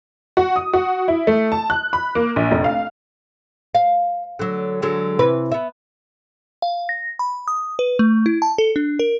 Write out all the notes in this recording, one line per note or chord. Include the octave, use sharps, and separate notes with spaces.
F#4
D#6
F#4
E4
A3
A5
F#6
B5
A#3
A#1
F1
F5
F5
D3 F#3
D3 F#3 G#3
C3 E3 B4
B3 E5
F5
A#6
B5
D#6
B4
A3
E4
A5
A4
D4
A#4